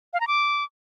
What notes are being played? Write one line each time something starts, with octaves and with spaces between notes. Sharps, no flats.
F5
A#5
D6